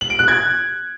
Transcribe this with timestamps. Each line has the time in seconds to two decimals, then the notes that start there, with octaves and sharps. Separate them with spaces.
0.01 F#7
0.10 D7
0.19 F#6
0.28 G#6